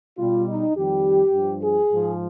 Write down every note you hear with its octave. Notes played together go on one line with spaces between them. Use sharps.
B2 G3 F4
D#4
F2 D#3 G3 G4
G2 F3
G#4
G#2 F3